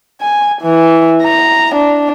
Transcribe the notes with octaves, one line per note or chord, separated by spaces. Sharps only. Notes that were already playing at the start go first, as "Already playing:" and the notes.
G#5
E3
A#5
D4